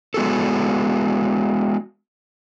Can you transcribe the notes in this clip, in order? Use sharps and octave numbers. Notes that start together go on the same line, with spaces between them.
G#3 B3 F#4 G#4 A4